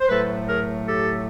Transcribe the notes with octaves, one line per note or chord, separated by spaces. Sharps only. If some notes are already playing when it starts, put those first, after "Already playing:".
C5
A2 F#3 A3 A4 B4
G#4 A#4
G4 A4